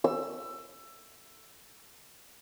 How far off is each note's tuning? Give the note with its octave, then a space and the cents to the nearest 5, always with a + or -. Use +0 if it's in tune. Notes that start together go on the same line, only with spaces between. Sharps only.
E6 +20